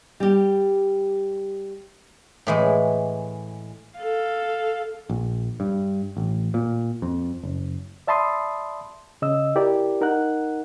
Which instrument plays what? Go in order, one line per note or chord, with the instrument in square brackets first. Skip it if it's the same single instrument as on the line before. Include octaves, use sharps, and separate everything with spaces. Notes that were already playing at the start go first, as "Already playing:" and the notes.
[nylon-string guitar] G3 G4
[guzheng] A2 E3 G#3
[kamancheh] A4 F5
[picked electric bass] A#1
G2
A1
A#2
F2
F#1
[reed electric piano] D5 E5 A5 B5 C6 D#6
C#3 D#5 E6
E4 G4 A#4 D5
D#4 A#4 F#5 F#6